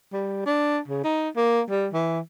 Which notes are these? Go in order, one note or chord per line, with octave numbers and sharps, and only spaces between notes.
G3
D4
C#3
D#4
A#3
G3
E3